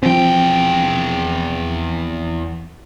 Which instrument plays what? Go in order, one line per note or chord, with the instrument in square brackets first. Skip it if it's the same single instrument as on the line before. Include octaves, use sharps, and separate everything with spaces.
[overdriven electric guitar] E2 G5 [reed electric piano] F3 C4